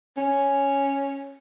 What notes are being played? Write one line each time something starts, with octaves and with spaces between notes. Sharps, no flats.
C#4